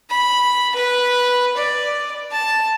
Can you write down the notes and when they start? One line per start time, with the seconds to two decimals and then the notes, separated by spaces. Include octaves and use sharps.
0.10 B5
0.75 B4
1.57 D5
2.32 A5